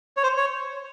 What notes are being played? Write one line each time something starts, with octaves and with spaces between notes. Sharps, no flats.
C#5
C5
C#5